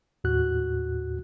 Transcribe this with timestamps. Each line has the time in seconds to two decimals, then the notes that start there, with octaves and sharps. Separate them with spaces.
0.24 D#2 A2 F#4 F#6